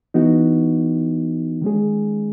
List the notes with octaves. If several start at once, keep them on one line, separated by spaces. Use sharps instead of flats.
E3 B3 D#4 F#4
D#3 G#3 C#4 G#4